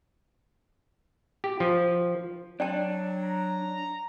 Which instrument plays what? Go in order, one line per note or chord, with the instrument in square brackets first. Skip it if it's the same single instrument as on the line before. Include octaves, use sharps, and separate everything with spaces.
[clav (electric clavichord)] G4
F3
[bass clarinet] F#3 [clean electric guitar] D4 [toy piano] D5 G5 A5
[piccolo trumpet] A#5